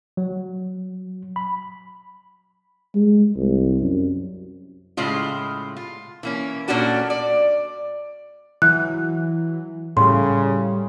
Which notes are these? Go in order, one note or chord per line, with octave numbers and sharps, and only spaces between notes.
F#3
B5
G#3
C2
F#2
A2 C#3 G#3 F4
F4
E3 A#3 C#4
A#2 A#3 C#4 D4 F#4 A4
D5
E3 F#3 F#6
A2 C#3 G3 C6